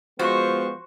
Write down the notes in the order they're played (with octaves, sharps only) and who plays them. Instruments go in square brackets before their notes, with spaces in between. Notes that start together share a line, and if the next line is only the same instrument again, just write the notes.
[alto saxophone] F3 [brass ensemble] G#3 B3 [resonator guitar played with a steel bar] F#4 [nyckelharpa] C5 C#6